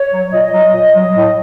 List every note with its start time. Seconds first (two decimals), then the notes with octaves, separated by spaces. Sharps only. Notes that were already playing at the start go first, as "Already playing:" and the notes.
Already playing: C#5
0.12 F#3
0.32 A#2 D#5
0.52 F#3
0.74 A#2
0.94 F#3
1.16 A2